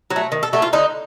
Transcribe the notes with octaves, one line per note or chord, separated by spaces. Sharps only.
F#3
A3
D#3
A4
F#3 A3 A4
F4
D3 D#4